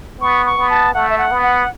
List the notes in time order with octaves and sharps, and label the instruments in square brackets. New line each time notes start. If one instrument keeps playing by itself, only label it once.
[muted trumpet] B3 [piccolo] C#6
[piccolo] C#6
[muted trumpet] B3
[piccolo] A5
[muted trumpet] A3 [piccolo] F#5
[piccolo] E5
F#5
[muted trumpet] B3
[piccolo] F#5